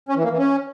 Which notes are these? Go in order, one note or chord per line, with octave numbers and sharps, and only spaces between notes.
C#4
E3
A#3
E3
C#4